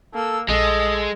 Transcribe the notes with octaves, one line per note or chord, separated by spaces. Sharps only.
A#3 A4 E6
A#1 G#3 A4 D#5